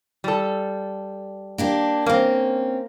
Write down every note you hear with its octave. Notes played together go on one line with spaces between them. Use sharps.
G3 A4
A#3 D4 G4
A#3 C4 C#4